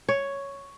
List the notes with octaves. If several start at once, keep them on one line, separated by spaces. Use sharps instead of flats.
C#5